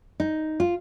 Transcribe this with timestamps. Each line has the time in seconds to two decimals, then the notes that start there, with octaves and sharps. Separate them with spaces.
0.20 D#4
0.60 F4